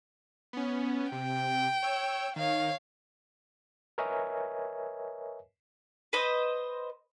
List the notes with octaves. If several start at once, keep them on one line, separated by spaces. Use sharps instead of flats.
B3 C#4
C3 G5
C#5 E6
D#3 C#5 F5
A#4 B4 C#5 D#5 E5 G#5
B4 C5 D#5